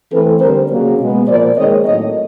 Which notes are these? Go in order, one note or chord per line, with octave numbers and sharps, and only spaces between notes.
E3 A3 C4 A4 B4
D3 G3 C4 A#4 C5
C#3 F#3 A#3
B2 G#3 B3
A#2 F3 A#3 C5 D5
D#3 G#3 C4 C#5 D#5
A2 F#3 A#3 C#5 D#5